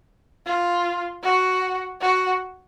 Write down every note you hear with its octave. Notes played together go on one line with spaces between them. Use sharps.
F4
F#4
F#4